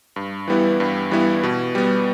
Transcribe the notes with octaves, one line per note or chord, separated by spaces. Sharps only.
G2
E3 G3 B3 E4
G2
E3 G3 B3 E4
B2
G3 B3